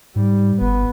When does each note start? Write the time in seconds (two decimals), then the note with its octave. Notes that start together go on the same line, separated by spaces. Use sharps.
0.16 G#2 G3
0.61 G1 B3